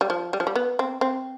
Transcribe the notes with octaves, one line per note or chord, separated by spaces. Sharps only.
G3
F3
G3
F3
G3
B3
C4
C4